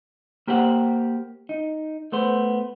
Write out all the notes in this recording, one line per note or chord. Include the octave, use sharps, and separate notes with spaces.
A#3 G4 C5 F#5
D#4
A3 B3 C5